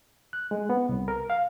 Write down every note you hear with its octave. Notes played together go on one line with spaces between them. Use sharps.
F#6
G#3
B3
C2
A#4
F5